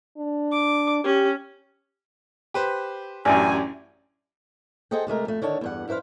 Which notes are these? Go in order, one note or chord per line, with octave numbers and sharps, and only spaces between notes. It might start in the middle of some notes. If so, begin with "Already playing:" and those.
D4
D6
C#4 G4
G4 B4 C5
A1 F#2 D4 G4 G#5
G#4 A4 C5 D#5 F#5 G5
C3 G#3 A3 A#4
F2 A3
D3 D#3 C#5 A5
E2 G2 F#5
F2 E4 B4 C5 F5